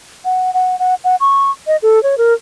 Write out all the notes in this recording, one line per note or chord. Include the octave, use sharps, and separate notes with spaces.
F#5
F#5
F#5
F#5
C#6
D#5
A4
C#5
A#4